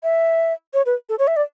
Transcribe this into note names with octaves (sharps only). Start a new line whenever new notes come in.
E5
C#5
B4
A4
C#5
E5
D5